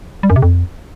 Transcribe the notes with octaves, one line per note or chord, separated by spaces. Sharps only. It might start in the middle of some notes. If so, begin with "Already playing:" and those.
G3
F#2
C3
F2